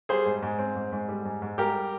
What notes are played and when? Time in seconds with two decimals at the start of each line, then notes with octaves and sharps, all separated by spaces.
0.09 G3 G#4 C5
0.26 G#2
0.42 G#2
0.59 C4
0.75 G#2
0.92 G#2
1.09 G3
1.25 G#2
1.42 G#2
1.58 G3 G4 A#4